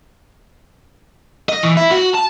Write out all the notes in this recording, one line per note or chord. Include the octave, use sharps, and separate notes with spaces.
D#5
E3
E4
F#4
A5